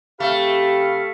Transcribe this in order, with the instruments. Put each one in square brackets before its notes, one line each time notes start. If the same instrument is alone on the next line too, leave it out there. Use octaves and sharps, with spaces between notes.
[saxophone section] C3 B4 F5 [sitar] A3 [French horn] G4